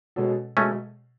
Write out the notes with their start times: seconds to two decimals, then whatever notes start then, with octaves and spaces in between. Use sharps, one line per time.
0.16 B2 G#3 C#4 F#4 A4
0.57 B2 G#3 A3 C#4